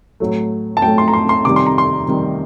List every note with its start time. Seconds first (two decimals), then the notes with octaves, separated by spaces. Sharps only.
0.20 A2 F#3 A3
0.77 A5
0.82 A2 F#3 A3 G5
0.98 C6
1.08 A#5
1.13 C6
1.29 C6
1.45 C3 D#3 G3 D6
1.56 C6
1.67 A#5
1.78 C6
2.07 C3 D#3 G3